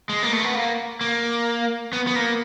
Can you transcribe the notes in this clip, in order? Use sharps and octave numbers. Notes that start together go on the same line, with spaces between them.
G#3
A#3
A3
B3
A#3
A#3
B3
B3
A#3